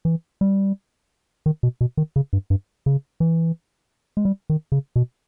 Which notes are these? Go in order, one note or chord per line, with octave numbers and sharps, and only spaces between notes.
E3
G3
D#3
B2
B2
D#3
C#3
G2
G2
C#3
E3
G#3
G3
D#3
C#3
B2